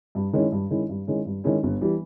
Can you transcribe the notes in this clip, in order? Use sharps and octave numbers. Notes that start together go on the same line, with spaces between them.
G2
D#3 G#3 C#4 E4
G2
D#3 G#3 C#4 E4
G2
D#3 G#3 C#4 E4
G2
D#3 G#3 C#4 E4
G1
E3 G3